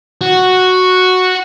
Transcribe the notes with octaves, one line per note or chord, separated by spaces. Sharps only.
F#4